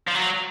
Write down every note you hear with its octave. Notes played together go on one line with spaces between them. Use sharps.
F3
F#3